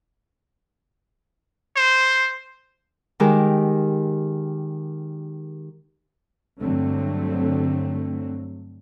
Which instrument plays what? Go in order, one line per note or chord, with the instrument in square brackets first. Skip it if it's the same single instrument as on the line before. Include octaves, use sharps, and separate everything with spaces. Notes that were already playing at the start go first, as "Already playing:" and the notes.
[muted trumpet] C5
[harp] D#3 G#3 G4 A#4
[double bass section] G2 D3 F#3 A3 C4